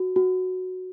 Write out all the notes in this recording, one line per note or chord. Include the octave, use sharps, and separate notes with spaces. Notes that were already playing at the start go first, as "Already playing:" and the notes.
Already playing: F#4
F#4